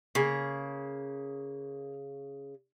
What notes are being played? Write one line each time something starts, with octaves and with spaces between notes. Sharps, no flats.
C#3 A#3 G#4